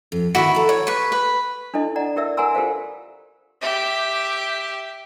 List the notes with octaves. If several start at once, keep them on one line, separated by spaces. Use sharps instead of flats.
F2
D#2 D#3 E4 F#4 B4
A4 A#5
C#5
B4 C#6
B4
D4 E4 A4 D#5
D5 D#5 F#5 A#5
E4 G4 A#4 D5 E5 E6
A#4 F#5 G#5 A#5 C6 E6
F4 G4 A4 C5 F5
G4 E5